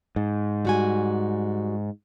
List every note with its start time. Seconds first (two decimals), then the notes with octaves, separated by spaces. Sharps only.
0.16 G#2
0.65 G3 F#4 G#5